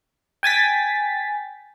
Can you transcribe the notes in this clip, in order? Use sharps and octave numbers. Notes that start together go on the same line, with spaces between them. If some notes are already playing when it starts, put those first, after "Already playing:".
G5 G#5 A6 B6